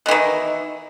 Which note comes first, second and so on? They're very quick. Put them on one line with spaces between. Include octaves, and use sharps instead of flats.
B2 E3 D#3